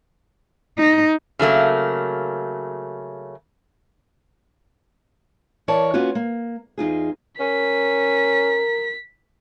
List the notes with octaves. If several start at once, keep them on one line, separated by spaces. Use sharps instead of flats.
D#4
C#3 F#3 A3 A#3
E3 A#4 C#5 D5 A5
A#3 B3 C#4 F4 F#4
A#3
E2 D#4 F4 G#4
C#4 A#4 B6